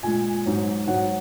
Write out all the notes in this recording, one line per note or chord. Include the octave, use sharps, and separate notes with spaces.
A#2 G#3 G#5
G#2 F#3
G#2 F#3 F#5